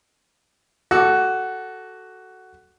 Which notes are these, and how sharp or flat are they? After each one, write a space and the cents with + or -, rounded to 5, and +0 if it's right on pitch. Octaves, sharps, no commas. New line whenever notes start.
F#4 +10 A4 +0 D6 +0